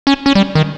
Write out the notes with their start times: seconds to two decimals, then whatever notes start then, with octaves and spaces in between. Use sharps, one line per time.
0.07 C#4
0.26 C#4
0.35 G3
0.55 D#3